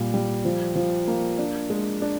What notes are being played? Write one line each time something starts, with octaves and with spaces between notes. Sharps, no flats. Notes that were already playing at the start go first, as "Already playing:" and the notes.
Already playing: A#2 G3
G3
F3
F3
A#3
D4
G#3
D4